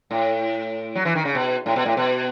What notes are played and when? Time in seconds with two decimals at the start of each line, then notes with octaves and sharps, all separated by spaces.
0.11 A2
0.95 F#3
1.05 E3
1.15 D#3
1.25 C#3
1.35 B2
1.66 A2
1.76 B2
1.86 A2
1.97 B2